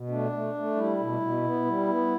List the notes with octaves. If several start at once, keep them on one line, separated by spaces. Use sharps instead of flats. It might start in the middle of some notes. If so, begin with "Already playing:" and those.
Already playing: B2
A3 D4
A3
A3
G3 E4
B2
B2
B3
G3
B3